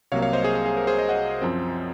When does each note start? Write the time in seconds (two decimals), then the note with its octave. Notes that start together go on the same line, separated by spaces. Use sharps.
0.12 C2 C3 F#3 A#3 C#5 F5
0.22 C#5 F5
0.33 C5 D#5
0.44 G#4
0.55 G#4
0.66 G#4
0.77 A#4
0.87 G#4 C5
0.98 C5 D#5
1.09 D#5 F#5
1.42 F#2 F3 C4